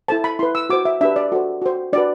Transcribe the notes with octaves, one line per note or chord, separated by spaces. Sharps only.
E4 A4 C5 A5
B5
E4 B4 C6
E6
F#4 C5 D6
E5
D4 G4 B4 E5
D5
F#4 A4 C5
F#4 C5
D4 F#4 B4 D5